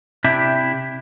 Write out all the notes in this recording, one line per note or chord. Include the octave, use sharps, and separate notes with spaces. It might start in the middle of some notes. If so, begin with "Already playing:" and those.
C3 D4 E4 G4